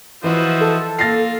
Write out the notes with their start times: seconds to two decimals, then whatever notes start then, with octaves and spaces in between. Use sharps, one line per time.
0.24 E3 F3 E4 F#4 C5 D#5
0.60 A4
0.99 A#3 F4 F5 A6 A#6 C7